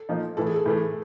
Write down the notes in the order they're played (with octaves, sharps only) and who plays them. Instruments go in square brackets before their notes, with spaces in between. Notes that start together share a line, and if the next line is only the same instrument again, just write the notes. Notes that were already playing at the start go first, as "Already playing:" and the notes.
Already playing: [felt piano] A4
[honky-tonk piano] A#2 F3 A#3 D#4
[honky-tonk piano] A2 E3 A3 [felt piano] A4
[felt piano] G#4
A4
[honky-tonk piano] A2 E3 A3